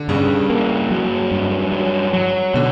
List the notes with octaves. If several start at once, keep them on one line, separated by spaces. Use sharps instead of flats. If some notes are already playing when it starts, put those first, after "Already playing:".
Already playing: D3
G2 C#3
A#3
F#3
G2
F#3
F#3
B2 D3